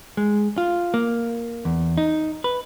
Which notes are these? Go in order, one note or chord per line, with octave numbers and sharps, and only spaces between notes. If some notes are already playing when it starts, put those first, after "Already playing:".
G#3
F4
A#3
E2
D#4
B4